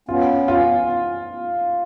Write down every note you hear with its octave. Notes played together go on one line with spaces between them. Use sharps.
B3 C#4 F4
F4